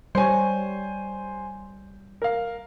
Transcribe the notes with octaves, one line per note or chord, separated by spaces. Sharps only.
G3 C5 C#5 G#5
A#4 F5